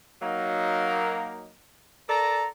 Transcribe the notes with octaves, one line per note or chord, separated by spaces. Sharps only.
F#3 A#3 D#4
A4 A#4 D5 A5 A#5